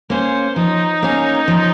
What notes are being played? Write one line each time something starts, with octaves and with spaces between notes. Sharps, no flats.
A#3 C#4 C5
F3 D#4
A#3 C#4
F3